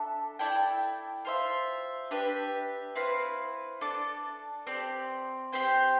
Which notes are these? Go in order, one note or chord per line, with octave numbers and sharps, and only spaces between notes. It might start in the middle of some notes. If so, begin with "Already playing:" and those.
Already playing: D4 A4 E5 A5
E4 A4 D5 G5
F4 C5 E5
D4 G4 B4 E5
C4 E4 B4 F5
D4 A4 D5 A5
C4 G4 D5
C4 G4 C5 G5